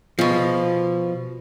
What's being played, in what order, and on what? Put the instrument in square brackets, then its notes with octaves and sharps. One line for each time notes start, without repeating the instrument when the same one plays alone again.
[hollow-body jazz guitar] B2 F3